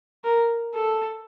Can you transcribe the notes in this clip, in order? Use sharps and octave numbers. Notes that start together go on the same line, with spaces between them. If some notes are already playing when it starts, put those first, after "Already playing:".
A#4
A4